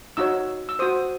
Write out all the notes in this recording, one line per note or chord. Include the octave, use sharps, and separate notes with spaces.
D#4 F#4 C#5 E6
E6
F#4 C5 D#6